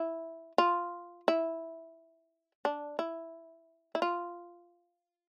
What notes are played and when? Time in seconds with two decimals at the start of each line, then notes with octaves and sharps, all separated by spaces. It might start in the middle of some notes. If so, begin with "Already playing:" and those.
Already playing: E4
0.58 F4
1.28 E4
2.65 D4
2.99 E4
3.95 E4
4.02 F4